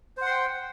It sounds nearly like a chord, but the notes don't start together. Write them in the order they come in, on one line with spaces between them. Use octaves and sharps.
C5 F#5 C6 G5